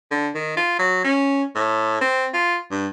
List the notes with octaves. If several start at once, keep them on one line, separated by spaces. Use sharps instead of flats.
D3
D#3
F4
F#3
C#4
A2
C4
F4
G2